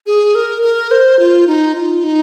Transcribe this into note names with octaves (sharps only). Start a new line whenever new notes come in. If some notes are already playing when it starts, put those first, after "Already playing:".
G#4
A#4
A#4
C5
F4
D#4
F4
D#4